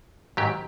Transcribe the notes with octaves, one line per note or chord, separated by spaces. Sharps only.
G#2 D#3 F#3 G4